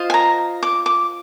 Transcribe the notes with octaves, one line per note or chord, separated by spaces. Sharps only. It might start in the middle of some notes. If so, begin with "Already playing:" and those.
Already playing: F4 C5 D#5
G#5
A#5
D6
D6